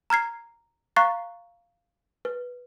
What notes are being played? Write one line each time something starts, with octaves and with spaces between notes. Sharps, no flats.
A#5 F6 G#6 C7
F5 A#5 C#6 F#6 A6 C7
B4